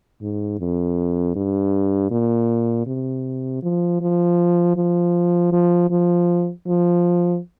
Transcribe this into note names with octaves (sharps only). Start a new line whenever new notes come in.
G#2
F2
G2
A#2
C3
F3
F3
F3
F3
F3
F3